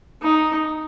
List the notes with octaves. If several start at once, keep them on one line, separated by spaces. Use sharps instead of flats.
D#4